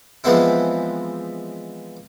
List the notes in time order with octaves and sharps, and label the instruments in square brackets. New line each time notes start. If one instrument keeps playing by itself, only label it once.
[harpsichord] E3 F3 G#3 B3 C4 E4